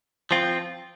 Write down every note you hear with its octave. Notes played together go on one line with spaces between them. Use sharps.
F3 C4 F4